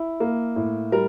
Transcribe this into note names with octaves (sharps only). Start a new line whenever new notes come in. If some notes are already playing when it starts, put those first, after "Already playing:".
Already playing: E4
A#3
A2
G3 A#4